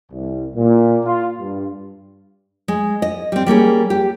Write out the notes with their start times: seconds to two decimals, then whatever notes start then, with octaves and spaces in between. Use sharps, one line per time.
0.12 C2
0.56 A#2
1.05 F4
1.39 G2
2.68 G#3
3.02 D#5
3.32 G3 C4
3.46 G3 A#3 C#4 G#4
3.90 G4